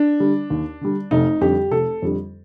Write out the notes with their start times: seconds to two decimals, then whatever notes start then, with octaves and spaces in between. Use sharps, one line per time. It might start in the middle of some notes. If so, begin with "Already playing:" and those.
Already playing: D4
0.20 D3 G3
0.50 D#2
0.81 D3 G3
1.11 F1 D#4
1.41 F2 D3 G3 G4
1.71 F1 A4
2.02 F2 D3 G3